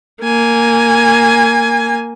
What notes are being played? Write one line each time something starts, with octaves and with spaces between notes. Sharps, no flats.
A#3 G#5